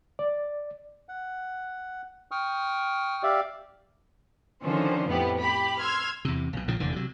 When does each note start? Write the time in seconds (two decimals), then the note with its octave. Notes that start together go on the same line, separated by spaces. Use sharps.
0.19 D5
1.09 F#5
2.31 G5 C#6 D#6 F6
3.23 G4 D5 E5 F5
4.62 D3 D#3 F3 C#4 C5
5.07 F2 A2 B3 G4
5.40 G4 B5
5.80 C6 E6 F6 G#6
6.25 E2 C3
6.53 B1 B2
6.68 A#1 A#2 C#3 F3
6.80 F1 E2 D3
6.92 C3 F#3